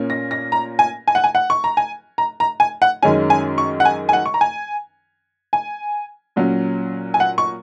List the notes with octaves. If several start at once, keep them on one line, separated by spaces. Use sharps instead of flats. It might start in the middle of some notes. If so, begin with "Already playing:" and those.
Already playing: A#2 A#3 C#4
A#6
A#6
A#5
G#5
G#5
F#5
G#5
F#5
C#6
A#5
G#5
A#5
A#5
G#5
F#5
F#2 D#3 G#3 C#4 G#5
G#5
C#6
F#5
G#5
G#5
F#5
C#6
A#5
G#5
G#5
A#2 F#3 C#4
G#5
F#5
C#6